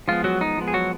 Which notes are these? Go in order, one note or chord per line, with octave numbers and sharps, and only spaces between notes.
F3 G#3 B3 F4
F#3 F#4
D#4
F3 G#3 B3
G#4
F#3 F#4